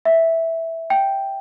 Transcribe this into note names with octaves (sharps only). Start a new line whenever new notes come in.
E5
G5